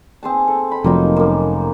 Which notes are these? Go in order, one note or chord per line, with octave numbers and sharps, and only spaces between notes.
C4 G#4 A5
A4
B5
F1 F3 F#3 A#3 C4 D#4
F#2 A#3